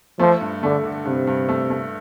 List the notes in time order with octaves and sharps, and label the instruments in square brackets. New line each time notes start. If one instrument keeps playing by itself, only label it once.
[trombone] F3 [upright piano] A3
[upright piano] G2
[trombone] D3 [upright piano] A3
[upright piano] D3
[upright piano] G2 [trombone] C3
[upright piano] G2
A3
A3